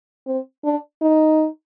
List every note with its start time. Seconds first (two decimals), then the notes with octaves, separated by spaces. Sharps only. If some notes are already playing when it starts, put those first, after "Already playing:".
0.27 C4
0.64 D4
1.02 D#4